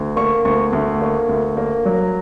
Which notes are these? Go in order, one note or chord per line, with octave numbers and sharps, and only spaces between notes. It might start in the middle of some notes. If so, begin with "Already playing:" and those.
Already playing: D2
A#3 C#6
D2 C#6
D2
A#3
D2
A#3
F#3